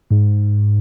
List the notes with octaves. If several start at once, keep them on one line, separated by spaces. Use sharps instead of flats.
G#2